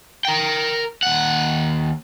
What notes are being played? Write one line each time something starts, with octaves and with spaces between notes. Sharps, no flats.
A#4 G5
D#2 F#5